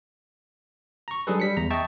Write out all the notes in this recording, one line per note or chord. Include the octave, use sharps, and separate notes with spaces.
A#5 C#6
F#3 G3 D4 G#4 A4 B4
G3 B6 C#7
E2 A#5
D#5 E5 G5 A5 C#6